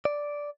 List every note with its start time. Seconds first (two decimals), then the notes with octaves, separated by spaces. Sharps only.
0.05 D5